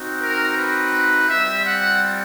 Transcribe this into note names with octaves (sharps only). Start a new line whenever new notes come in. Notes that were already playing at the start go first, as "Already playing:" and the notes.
Already playing: C4 D#4 F#4
A#4
B4
G3 C4 F4 E5
F#5